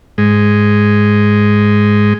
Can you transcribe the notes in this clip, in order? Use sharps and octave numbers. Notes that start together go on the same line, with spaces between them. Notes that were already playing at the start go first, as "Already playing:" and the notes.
G#2 G#3